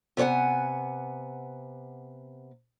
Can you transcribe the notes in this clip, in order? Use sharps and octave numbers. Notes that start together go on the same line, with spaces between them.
C3 B3 C#5 F#5 G#5